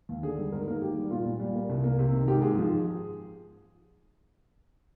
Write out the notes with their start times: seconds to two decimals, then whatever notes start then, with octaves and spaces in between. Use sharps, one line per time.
0.09 D#2
0.23 D3 G#4
0.38 G3
0.52 G#2 A#4
0.68 A#3 A#4
0.81 D#3 G4
0.97 G3
1.11 A#2 F4
1.25 A#2
1.40 G3
1.55 A#3
1.70 C2
1.84 A#3
1.99 C3
2.13 D#3
2.28 G#2 G4
2.42 G#2 G#4
2.57 F3